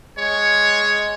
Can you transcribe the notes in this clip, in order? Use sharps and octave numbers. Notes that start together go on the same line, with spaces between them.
G#3 C#5